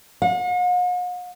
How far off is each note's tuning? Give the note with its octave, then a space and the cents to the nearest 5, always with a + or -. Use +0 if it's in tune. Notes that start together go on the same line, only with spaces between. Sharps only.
F#5 -45